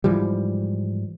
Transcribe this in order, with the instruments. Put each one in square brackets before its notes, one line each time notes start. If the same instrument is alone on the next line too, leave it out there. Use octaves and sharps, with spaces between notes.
[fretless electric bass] G#2 E3 F3 G3